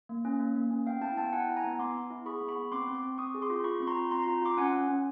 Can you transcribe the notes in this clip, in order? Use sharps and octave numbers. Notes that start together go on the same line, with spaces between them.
A#3
C#4
A#3
A#3
C#4
B3 F5 G5
E4 G5 A5
B3 G5 A5
E4 F#5 G#5
E4
G#5 A#5
B3
B3 C6 D6
B3
E4
G#4 B5 C#6
B3
B5 C#6
B3
C4 C6 D6
C4
C6 D6
C4
C4 C#6 D#6
G#4
C6 D6
F4
F4 B5 C#6
C4 C#6
A#5 C6
F4
C4 A#5 C6
A#5 C6
F4
F4 C6 D6
C#4 F#5 G#5
C#4
C#4